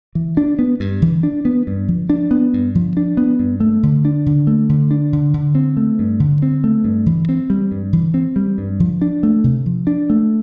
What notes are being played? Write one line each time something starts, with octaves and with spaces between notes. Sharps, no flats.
E3
D4
B3
G2
E3
D4
B3
G2
F3
D4
B3
G2
F3
D4
B3
G2
A3
D3
D4
D3
A3
D3
D4
D3
D3
C4
A3
G2
D3
C4
A3
G2
E3
C4
G3
G2
E3
C4
G3
G2
F3
D4
A3
C3
F3
D4
A3